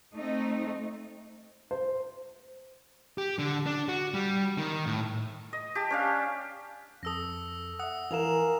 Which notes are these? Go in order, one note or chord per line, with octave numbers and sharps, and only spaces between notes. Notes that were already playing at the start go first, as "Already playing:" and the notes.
A3 C4 D#4
C5
G4
D3
D4
F#4
G3
D#3
A2
D#5
G4 A5
C#4 D4 F5
F2 A4 D#6 E6 A#6
E5 F#5 D#6
E3 A#4 F5 G#5 E7 F7